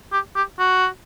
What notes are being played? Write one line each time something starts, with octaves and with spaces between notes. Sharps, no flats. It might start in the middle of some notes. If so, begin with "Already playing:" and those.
G4
G4
F#4